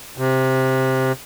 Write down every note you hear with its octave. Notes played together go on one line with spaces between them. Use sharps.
C3